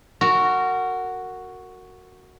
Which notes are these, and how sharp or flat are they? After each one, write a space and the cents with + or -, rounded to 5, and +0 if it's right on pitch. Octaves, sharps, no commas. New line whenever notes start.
F#4 +0 A#4 -25